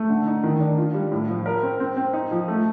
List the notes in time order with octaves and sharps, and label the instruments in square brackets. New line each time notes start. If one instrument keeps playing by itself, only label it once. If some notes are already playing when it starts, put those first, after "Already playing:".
Already playing: [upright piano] A3
D3
D#4
D#3
D4
F4
G3
A2
F3
A#4
C4
C4
C4
D#4
F3
A3